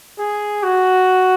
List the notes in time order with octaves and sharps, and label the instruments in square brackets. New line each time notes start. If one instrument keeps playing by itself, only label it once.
[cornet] G#4
F#4